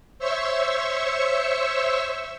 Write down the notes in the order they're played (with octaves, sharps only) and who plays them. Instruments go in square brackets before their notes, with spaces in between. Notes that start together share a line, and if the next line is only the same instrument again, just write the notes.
[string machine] C5 C#5 E5 C#6 E6